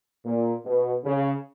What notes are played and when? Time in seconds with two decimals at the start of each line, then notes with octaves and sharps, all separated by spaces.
0.25 A#2
0.65 B2
1.04 C#3